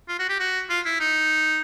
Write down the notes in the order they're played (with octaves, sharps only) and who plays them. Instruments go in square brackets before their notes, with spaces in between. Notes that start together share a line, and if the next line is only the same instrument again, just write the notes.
[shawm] F4
F#4
G4
F#4
F4
E4
D#4